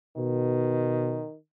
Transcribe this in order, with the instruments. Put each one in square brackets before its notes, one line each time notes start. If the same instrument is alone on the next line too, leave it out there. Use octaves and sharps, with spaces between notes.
[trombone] B2 [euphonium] D#3